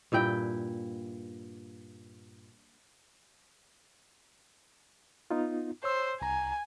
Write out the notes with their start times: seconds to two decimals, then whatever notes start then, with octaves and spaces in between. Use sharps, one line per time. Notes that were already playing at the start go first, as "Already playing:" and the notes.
0.12 G2 A#2 E4 G5
5.31 B3 D#4 F4
5.84 C5 C#5 E6
6.22 C2 G#5 A#5